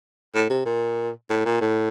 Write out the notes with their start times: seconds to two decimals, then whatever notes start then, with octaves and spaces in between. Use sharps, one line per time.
0.35 A2
0.50 C3
0.66 A#2
1.30 A2
1.45 A#2
1.61 A2